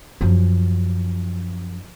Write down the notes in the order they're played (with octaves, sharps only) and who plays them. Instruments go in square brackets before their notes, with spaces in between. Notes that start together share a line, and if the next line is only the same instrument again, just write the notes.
[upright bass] F#2 F3